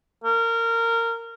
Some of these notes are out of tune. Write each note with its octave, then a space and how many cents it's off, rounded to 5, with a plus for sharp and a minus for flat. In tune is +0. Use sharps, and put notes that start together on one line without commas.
A#4 -20